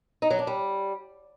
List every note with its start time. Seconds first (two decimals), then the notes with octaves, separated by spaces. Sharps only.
0.22 D#4
0.30 F#3
0.39 D4
0.47 G3